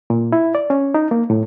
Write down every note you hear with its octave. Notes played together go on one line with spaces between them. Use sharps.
A#2
E4
D5
C#4
D#4
A#3
A2